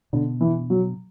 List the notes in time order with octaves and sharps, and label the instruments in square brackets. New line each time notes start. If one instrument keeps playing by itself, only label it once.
[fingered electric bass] B2 B3 D4 [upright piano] D3
[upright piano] E3
F#3